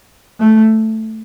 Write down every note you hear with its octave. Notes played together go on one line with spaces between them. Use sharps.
A3